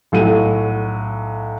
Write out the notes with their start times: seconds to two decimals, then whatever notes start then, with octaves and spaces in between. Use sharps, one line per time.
0.12 B1 A2 F#3 F#4 D#7